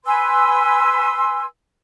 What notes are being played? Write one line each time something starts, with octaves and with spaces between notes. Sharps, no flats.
B4 G#5 C6 E6